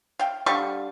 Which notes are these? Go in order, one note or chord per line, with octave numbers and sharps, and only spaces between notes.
F5 G5
D3 G3 F5 C#6